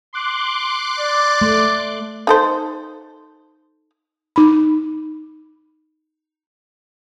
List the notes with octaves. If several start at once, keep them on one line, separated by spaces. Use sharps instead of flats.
C6 D6 F#6
D5
A3
D#4 A4 C5
D#4 B5